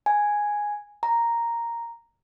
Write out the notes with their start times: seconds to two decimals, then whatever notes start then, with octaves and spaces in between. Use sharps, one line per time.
0.06 G#5
1.03 A#5